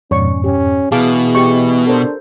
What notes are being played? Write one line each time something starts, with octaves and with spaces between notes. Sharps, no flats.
F2 G#2 B2 C#4 C#5 D5 C#6
C#4 G4
B2 E3 G#4 F5 A5 D6
G4 D#5 C#6
D4 A4 A#4 C5